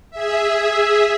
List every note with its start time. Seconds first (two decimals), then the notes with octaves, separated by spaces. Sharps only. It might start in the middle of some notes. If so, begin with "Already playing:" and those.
0.10 G#4 E5